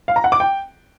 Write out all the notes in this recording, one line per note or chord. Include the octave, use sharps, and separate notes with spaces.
F5
A#5
F#5
D6
G5